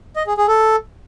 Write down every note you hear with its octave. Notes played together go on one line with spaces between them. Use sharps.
D#5
G#4
G#4
A4